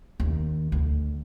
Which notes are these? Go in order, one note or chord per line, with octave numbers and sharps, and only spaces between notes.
D#2
D2